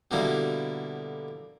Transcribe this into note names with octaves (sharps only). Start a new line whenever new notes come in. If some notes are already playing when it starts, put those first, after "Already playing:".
B2 D3 G3 A#3 E4